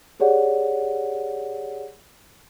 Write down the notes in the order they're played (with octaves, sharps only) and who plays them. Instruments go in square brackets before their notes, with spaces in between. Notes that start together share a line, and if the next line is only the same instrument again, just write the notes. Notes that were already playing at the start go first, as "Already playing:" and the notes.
[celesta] G4 G#4 C#5 D5 F#5